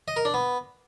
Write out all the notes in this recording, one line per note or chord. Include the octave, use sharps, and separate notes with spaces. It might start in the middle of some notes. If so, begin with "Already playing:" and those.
D#5
A#4
D4
B3